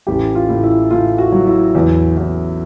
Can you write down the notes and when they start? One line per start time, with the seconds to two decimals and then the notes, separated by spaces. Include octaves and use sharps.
0.07 A1 G4
0.35 F4
0.49 A2
0.64 E4
0.90 A2 F4
1.18 F#4
1.32 F#3
1.47 E4
1.75 E2
2.17 E2